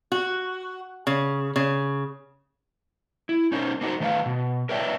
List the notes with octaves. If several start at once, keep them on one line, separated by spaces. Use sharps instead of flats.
F#4
C#3
C#3
E4
C#4 D#4 A#4 C5
A#3 C4 D#4 F#4 A#4 C5
D#3 A3 B4 D#5 F5
B2
A#4 B4 C#5 D5 E5 G5